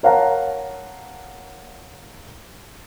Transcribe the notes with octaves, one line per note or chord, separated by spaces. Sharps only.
A#4 C#5 F5 F#5 A5 A#5